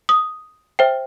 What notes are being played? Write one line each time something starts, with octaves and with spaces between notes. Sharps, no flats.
D#6
C5 E5 G5